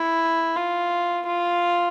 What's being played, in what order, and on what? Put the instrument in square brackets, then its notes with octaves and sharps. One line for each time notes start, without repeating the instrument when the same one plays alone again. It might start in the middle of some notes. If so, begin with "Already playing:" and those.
Already playing: [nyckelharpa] E4
F4
F4